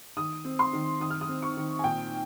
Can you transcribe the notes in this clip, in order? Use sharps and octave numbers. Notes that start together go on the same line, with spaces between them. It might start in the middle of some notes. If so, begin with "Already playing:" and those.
D#3 D#6
C4
C6
D#3
D#3 D#6
F6
D#6
C4
C#6
D#3
G#5
A#2 G5